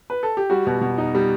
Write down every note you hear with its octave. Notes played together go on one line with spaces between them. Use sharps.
B4
A4
G4
G3 F#4
B2
B2
D#4
G3